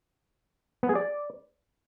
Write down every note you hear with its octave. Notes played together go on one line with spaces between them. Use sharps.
B3
G#4
D5